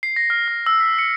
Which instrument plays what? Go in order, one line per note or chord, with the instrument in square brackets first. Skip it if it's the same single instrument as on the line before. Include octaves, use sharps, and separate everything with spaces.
[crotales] C7
A#6
F6
F6
E6
B6
C#7